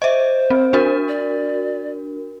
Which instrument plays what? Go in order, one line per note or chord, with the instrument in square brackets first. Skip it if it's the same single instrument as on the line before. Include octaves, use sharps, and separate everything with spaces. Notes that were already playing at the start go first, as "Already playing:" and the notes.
[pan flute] C5 [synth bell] D#5 E5
[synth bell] C4
D4 F#4 A#4
[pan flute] D5